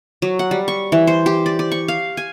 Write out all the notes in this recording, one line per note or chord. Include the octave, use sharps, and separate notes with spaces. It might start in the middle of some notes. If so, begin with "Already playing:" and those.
F#3
F#5
G3
C#6
E3
C5
G4
D5
D5
C#6
F5
G#5